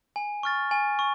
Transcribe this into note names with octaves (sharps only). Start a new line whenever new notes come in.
G#5
C#6 F6 A6
G#5
C#6